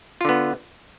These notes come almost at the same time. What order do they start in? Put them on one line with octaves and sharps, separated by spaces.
F4 D3 B3